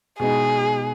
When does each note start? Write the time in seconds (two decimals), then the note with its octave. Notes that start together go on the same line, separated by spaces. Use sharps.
0.19 B2 G#3 B3 D#4 G#4